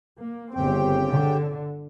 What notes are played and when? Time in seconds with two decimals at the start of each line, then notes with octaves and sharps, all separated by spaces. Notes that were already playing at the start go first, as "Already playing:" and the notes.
0.19 A#3
0.54 G1 C#3 C4 G4 G5
1.09 D3